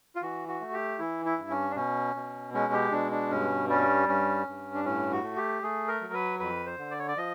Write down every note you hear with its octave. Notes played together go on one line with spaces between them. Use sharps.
F4
E3 F#4
F#4
A3
G4
E3 E4
E4
G2
C#4
D4
B2 C#4
B2
G#3 C#4
G4
B2 D4
D4
G2 C#4
G3 C#4
G2 C#4
G2
D4
A2 C#4
F#4
A3
G4
A3 G#4
A#4
F#3
B4
F2 B4
C5
D3
D5
C#5
D5
F3 D#5